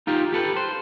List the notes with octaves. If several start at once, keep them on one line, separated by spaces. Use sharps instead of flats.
D#4 F4 G4
G4 A4 B4
C5